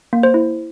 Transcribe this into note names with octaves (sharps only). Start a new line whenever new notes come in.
A#3
C5
E4